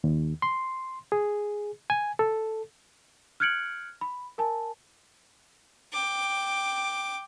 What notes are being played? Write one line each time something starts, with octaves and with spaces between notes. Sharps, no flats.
D#2
C6
G#4
G#5
A4
F6 F#6 G#6 C#7 D7 F#7
B5
A#4 G#5 A5
G5 D6